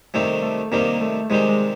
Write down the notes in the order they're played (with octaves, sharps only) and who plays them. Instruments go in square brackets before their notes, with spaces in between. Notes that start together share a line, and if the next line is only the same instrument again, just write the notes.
[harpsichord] C3 D#3 G3 C4 [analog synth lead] A3
[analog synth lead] A3
[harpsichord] C3 D#3 G3 C4 [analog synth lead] A#3
[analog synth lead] A3
[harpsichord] C3 D#3 G3 C4 [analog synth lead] G#3
[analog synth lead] G#3